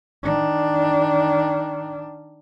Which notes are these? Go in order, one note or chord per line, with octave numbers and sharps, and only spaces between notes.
D#3 D4